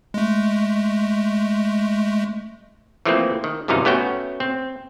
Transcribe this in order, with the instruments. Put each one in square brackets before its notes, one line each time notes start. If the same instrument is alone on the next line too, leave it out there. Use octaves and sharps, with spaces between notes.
[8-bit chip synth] G#3 A3
[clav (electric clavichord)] E3 F3 A3 A#3 C4
D#3
G1 F#2 C3 E3 D#4 F5
A3 B3 C#4 F#4 G5
C4